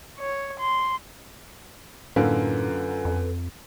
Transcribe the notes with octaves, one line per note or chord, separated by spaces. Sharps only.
C#5
C6
F#2 A2 D3 A#3 F4 A4 B4
F2